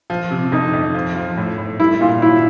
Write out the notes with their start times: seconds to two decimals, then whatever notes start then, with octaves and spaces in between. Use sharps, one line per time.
0.10 F3
0.31 C3
0.52 F2 D#4
0.73 F2
0.94 F3
1.15 F3
1.37 A2
1.58 A2
1.80 G3 E4
2.01 A#2 F4
2.22 F#3 E4